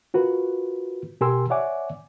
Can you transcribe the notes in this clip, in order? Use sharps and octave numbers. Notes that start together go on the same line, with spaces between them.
F4 F#4 A#4 B4
B2 G4 A#4 G#5 C6 E6
C#5 D5 E5 F#5 G#5 D6